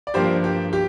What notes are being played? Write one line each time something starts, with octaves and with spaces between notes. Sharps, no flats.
D5
G2 F3 A#3 G4 C5
G4
G4